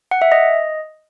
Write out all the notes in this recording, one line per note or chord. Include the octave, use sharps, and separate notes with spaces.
F#5
E5
D#5